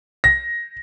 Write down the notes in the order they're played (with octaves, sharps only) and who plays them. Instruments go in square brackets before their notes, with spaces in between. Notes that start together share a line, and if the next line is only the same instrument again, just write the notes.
[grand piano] A#6